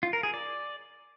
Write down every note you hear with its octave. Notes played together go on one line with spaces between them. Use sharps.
F4
A#4
G#4
D5